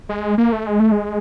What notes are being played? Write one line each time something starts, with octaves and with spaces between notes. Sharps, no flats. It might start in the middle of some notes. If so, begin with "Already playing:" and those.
G#3
A#3
A3
G#3
A3
G#3